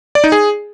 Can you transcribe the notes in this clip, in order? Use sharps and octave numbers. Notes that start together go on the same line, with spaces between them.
D5
D#4
G#4